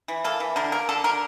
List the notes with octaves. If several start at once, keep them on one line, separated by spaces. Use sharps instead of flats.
E3
A#3 A4
E3
D3 A#4
A#3 A#4
D3 A4
D3 A#4